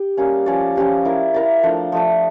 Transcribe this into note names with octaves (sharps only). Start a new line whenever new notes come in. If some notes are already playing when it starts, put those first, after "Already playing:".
Already playing: G4
G3 A#3 C#4
F3 C#4 G4 D5
F3 C#4 G4 D5
E4 A#4 D5
E4 A#4 D5
F3 A3 D4
F3 A3 D4